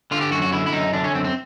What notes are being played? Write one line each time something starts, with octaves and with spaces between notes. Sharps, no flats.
D3 F4
G4
F#2 F#4
F#4
D3 E4
E4
F#2 D#4
D3 D4
C#4
F#2 C4
C4